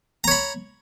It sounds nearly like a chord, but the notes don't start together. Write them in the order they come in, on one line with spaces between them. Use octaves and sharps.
A#5 C#5 B5